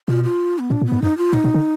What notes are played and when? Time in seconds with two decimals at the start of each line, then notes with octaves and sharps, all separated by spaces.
0.08 B2 F4
0.24 F4
0.59 B3
0.70 A#2 D4
0.81 A#2
0.86 B3
0.92 G#2
1.02 F#2 D#4
1.18 F4
1.33 A#2 D#4
1.44 B2
1.54 D3